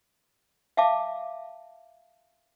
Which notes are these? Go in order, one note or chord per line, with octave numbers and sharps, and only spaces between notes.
E5 F5 A5 D6